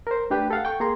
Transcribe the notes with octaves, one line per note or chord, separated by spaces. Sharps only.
A#4 C5
A3 D4 G4 B4 G5
A4 F5 F#5
G5 C#6
A#3 G#4 A#5 C6